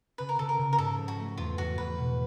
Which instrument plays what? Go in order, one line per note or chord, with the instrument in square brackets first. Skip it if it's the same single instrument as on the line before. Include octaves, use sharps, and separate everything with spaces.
[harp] C#3 [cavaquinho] B4
[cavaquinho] A#4
[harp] C#3 [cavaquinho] A4
[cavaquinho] A#4
[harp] C#3
[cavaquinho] A#4
[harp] G#2 [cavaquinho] A4
[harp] F3
[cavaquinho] F#4
[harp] A3
[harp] E2 [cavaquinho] F4
[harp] E2 [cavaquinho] F#4
[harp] E2 [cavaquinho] B4
[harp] B2